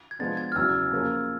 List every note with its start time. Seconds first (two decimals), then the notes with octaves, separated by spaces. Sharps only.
0.11 G#6
0.19 F3 G#3 B3 D4 A6
0.37 G#6
0.52 F6
0.56 E2 C#3 F#3 B3 E6
0.92 F3 A#3 C#4 F4 G#4